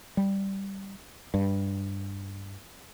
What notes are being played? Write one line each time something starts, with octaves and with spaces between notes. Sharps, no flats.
G3
G2